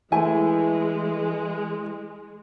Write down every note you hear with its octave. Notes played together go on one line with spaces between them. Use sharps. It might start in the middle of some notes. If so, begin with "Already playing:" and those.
E3 G#3 A3 E4 G#5